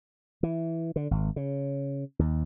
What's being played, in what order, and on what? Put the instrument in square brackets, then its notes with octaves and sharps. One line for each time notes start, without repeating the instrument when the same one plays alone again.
[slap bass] E3
D3
G#1
C#3
D#2